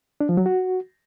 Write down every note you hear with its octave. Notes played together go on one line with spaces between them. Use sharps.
D4
F3
F#3
F#4